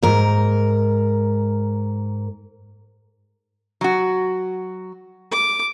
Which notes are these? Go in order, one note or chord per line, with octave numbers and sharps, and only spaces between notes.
G#2 A#4
F#3 F#4
D6